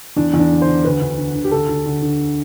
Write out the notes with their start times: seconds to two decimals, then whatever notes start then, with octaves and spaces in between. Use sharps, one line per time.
0.16 E2 D4
0.34 E2
0.39 D4
0.50 D3
0.62 C5
0.67 D3
0.85 D2 B4
1.01 D2
1.18 D3
1.35 D3
1.45 G4
1.51 D2 A4
1.68 D2
1.86 D3
2.02 D3